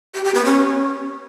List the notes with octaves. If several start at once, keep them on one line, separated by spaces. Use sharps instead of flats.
G4
G4
B3
C#4